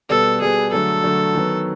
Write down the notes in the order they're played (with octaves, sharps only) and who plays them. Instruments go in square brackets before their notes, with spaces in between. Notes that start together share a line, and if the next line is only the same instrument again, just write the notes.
[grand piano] B2 G3 B3 [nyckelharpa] A4
[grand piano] B2 G3 B3 [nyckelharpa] G#4
[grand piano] D3 F#3 A3 [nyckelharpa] A4
[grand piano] D3 F#3 A3
D#3 F#3 B3